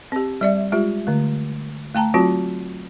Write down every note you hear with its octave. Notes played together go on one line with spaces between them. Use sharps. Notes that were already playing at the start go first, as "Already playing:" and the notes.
C4 G4
G3 D5 E5
G#3 F4 G4
D3 A3
A3 G5 A5 A#5
F#3 C4 F4 F#4